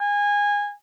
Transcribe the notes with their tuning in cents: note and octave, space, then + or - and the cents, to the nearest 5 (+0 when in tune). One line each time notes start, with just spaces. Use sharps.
G#5 -20